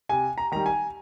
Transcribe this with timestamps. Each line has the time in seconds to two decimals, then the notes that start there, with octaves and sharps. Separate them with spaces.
0.09 C3 G#5
0.38 A#5
0.52 D#3 G3 A#5
0.66 G#5